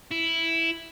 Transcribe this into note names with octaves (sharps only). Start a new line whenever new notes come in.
E4